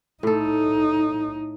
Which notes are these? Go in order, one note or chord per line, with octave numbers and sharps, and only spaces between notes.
A2 D#4 A4